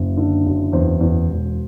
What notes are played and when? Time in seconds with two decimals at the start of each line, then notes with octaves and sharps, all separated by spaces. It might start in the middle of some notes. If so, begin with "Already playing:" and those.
Already playing: F#1
0.17 D3
0.46 F#1
0.73 E2 C5
1.01 E2
1.29 E1